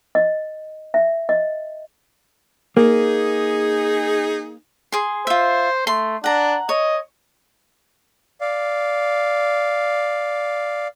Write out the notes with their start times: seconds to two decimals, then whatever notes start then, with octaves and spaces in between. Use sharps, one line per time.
0.15 D#5
0.94 E5
1.29 D#5
2.77 A#3 D#4 G#4
4.92 G#4 C6
5.27 F4 C5 E5
5.87 A3 C6
6.24 D4 F#5 A#5
6.69 C#5 D#5
8.41 D5 F5